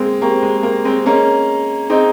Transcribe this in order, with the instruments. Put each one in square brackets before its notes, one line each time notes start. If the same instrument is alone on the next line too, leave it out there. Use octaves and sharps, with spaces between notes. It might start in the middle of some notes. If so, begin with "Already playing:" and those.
Already playing: [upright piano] G#3 A#3 C4
[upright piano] A#3 [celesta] G4 C5 G5 A#5 C#6
[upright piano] G#3
A#3
G#3 C4
[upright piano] A#3 C#4 [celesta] G#4 D#5 A#5
[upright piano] C4 D#4 [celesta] G#4 D#5 A#5